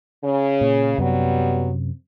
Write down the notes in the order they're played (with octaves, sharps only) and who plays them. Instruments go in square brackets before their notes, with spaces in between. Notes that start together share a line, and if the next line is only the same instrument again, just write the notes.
[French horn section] C#3
[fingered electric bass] A#2
[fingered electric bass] F#2 C3 [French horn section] F#3 G3 B3